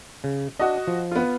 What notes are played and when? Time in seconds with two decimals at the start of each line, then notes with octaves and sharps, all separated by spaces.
0.24 C#3
0.59 D4 F#4 D#5
0.87 F3
1.11 B3 F4